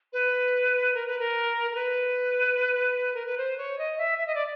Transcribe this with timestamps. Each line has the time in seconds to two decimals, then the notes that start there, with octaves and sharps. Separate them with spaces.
0.13 B4
0.94 A#4
1.07 B4
1.19 A#4
1.71 A#4
1.75 B4
3.14 A#4
3.26 B4
3.37 C5
3.58 C#5
3.78 D#5
3.98 E5
4.18 E5
4.27 D#5
4.35 D5